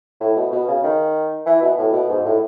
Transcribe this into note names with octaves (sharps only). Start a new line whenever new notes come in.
A2
B2
B2
C#3
D#3
E3
B2
A2
B2
G#2
A2